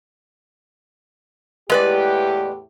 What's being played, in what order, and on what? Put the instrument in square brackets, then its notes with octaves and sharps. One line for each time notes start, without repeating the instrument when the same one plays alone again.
[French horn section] E2 A2 G4 [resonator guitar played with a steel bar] G#3 B4 D5